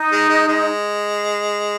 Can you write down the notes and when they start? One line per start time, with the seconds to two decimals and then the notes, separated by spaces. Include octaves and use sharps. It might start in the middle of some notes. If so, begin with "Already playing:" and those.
Already playing: D#4
0.12 G#3
0.29 G#3
0.48 G#3